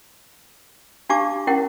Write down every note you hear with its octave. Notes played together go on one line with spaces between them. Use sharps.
D4 G4 F5 A5 C#6 D6
C#4 E4 A#4 F#5 G5